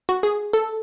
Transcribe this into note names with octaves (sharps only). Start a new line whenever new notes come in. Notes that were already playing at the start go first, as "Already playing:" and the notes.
F#4
G#4
A4